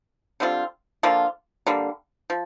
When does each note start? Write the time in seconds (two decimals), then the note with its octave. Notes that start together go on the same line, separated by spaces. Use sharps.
0.40 D3 G3 C4 F4
1.03 D3 F3 A#3 F4
1.67 D3 G3 A#3
2.30 F3